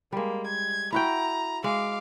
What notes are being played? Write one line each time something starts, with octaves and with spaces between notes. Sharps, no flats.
G3 G#3 A#3
G#6
E4 F#4 G5 A#5
G#3 F5 D6